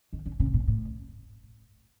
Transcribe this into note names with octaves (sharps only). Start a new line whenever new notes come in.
D#3
D3
C#3
A#2
A2